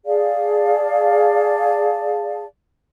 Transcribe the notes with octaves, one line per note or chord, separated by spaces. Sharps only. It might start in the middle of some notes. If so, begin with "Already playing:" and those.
G#4 D5 F5 A5